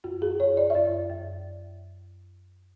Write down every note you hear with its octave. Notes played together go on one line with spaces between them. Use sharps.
F#2 F#4
G#4
F#2 C#5
D5
E5
F#2 D5
F#2